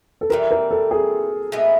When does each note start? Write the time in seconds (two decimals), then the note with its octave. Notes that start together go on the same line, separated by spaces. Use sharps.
0.21 A4
0.30 E3 G3 C4 A#4
0.51 A#4
0.71 A4
0.91 G#4
1.52 A2 E3 G#3 B3